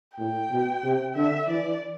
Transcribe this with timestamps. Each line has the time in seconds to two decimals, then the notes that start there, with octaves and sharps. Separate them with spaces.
0.18 A2 G5
0.51 B2
0.83 C3
1.15 D3 E5
1.48 E3 D5